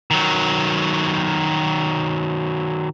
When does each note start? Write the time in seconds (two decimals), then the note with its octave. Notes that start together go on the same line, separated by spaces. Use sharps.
0.11 D#3 F#3